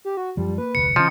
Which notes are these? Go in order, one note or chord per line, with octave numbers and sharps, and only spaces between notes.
G4
F#4
F#2 F3 G3
A#3 B4
F1 D2 C#7
C#3 E3 F3 C#4 D#5